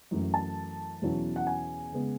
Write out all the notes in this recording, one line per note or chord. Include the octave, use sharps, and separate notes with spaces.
F#2 E3 A3 E4
A5
E2 B2 F#3 C#4 E4
F#5
G#5
C#3 G#3 B3